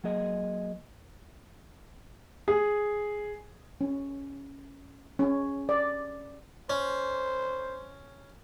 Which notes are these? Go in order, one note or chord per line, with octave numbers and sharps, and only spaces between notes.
F#3 A#3 G#4 D#5
G#4
C#4
C#4
D5
C#4 C5